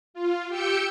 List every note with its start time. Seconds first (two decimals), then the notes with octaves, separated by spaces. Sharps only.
0.14 F4
0.49 G4 G5 E6 G6 C#7